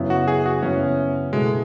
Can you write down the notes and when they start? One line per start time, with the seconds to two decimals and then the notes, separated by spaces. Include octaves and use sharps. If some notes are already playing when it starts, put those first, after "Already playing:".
Already playing: F#2 C#3 F#3 B3 E4
0.10 F#4
0.28 G#4
0.46 F#4
0.63 F#2 C#3 F#3 B3 C#4 E4
1.33 B2 G#3 A3 E4 A4